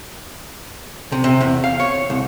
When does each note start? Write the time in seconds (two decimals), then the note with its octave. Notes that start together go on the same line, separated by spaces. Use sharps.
1.12 C3
1.24 C3
1.41 E2
1.64 F5
1.80 C#5
2.10 C2